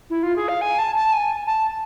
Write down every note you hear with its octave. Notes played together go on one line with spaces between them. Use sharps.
E4
F4
G#4
F5
G#5
A5
A5
G#5
A5